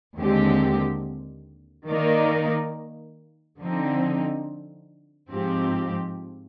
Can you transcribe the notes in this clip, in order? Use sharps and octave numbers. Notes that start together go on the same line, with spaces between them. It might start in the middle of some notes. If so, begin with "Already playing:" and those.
D#2 D3 G#3 C4 G4
D#3 A#3 D#4 A#4 D5
D3 F3 C4 D#4
G#2 F3 C4 G4